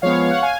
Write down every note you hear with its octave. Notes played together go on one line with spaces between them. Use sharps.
F3 G#3 B3 C#5 F5
F#5
F5 G#5